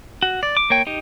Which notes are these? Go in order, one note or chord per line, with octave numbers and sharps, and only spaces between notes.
F#4
D5
D6
A#3 C#5 G5
D#4 G4